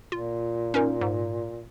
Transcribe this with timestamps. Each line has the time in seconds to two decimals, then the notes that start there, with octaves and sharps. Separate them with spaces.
0.12 A#2 F4
0.74 C#4 D#4 A#4
1.01 G#2